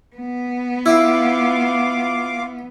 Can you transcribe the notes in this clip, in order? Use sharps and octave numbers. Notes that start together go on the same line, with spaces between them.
B3
E4 F4 F5 D6